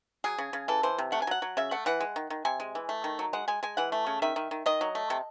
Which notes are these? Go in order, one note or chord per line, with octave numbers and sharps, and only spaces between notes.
F#3 G#4
C#3
C#3
E3 A4
E3 C5
C3
A3 F#5
G#5
F#3 F#5
F#3
C#3 E5
A3 F#5
E3 F#5
G#3
D#3
D#3
C3 G#5
G#3
E3
A3
D#3
F#3
G#3 F#5
G#3 G#5
G#3 G#5
E3 F#5
A3
C#3
D#3 E5
D#3
D#3
D#3 D#5
F#3
A3
C3